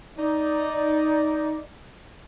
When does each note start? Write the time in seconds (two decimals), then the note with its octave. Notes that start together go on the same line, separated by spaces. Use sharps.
0.18 D#4 D5